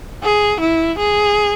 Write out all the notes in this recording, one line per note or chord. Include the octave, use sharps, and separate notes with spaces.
G#4
E4
G#4